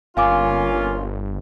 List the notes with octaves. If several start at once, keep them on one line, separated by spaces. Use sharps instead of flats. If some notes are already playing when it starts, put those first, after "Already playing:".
G1 A#3 C#4 F4 F5 G#5 D6